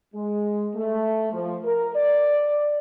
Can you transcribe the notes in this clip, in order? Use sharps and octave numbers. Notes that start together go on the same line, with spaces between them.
G#3
A3
F3
A#4
D5